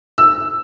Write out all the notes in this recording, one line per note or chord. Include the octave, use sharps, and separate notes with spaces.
E6